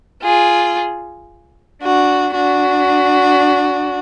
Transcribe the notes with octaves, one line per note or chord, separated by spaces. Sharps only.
F4 G#4
D4 F#4
D4 F#4